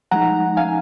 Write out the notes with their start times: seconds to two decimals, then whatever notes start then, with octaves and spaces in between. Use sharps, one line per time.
0.11 F3 G#3 D#4 F#5 A#5
0.57 F5 G#5